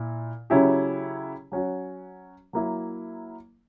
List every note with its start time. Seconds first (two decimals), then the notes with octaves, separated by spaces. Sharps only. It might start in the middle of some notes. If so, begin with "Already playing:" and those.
Already playing: A#2 E4
0.50 C#3 F#3 C#4 E4 G4
1.52 F#3 C#4 F#4
2.53 F#3 A#3 E4